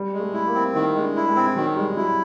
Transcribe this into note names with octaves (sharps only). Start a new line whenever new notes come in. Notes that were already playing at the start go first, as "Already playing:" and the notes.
Already playing: G3
G#3
A3
E4
A#3
C4
D#3 E4
G#3
D4
E4
G#3
C4
D#3 F#3
G3 G#3
F#3 E4